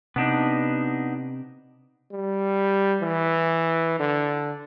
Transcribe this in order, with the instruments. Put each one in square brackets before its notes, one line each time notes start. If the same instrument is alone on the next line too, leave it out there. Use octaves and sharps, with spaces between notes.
[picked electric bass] C3 [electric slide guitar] B3 D4 D#4
[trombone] G3
E3
D3